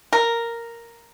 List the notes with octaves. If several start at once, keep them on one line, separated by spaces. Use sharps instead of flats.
A#4